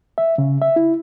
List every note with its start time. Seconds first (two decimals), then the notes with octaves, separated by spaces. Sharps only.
0.18 E5
0.38 C#3
0.62 E5
0.76 E4